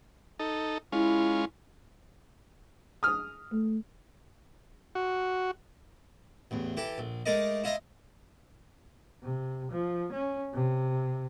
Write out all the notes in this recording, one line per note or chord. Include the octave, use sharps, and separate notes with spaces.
D#4 A4
G#3 C#4 E4 F4
D#6 F6
A3
F#4
A1 E2
E3 G4 A4
A#1
G#3 A3 D#4 A#4 D5 D#5
E4 F4 D#5 F5 A#5
C3
F3
C#4
C3